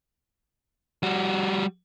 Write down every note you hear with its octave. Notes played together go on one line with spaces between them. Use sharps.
G3 F#4